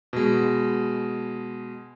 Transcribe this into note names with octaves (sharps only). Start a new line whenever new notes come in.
B2 G#3